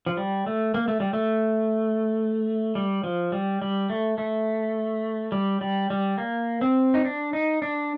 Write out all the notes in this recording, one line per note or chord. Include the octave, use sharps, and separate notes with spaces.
F3
G3
A3
A#3
A3
G3
A3
G3
F3
G3
G3
A3
A3
G3
G3
G3
A#3
C4
D#4
D4
D#4
D4